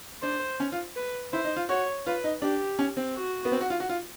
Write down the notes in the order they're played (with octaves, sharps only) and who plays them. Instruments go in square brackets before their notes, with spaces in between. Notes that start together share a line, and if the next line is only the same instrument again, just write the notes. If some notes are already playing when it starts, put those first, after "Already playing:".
[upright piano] D4 [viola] C5
[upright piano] C#4
F4
[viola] B4
[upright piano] E4 [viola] C5
[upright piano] D#4
F4
[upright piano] F#4 [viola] C#5
[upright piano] F4 [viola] B4
[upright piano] D#4
[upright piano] D4 [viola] G4
[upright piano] C#4
C4
[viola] F#4
[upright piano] B3
C4
F#4
F4
F#4
F4